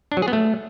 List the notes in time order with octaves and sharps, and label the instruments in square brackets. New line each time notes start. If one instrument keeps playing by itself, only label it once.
[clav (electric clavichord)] D4
F#3
G#4
B3
A3